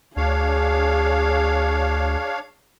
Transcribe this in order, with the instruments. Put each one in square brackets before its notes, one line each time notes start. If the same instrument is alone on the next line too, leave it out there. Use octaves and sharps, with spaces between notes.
[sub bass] D2 [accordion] D4 C#5 F5 [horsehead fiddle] G#4